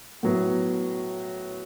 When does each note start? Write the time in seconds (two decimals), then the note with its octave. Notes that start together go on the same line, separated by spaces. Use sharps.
0.23 A2 F#3 B3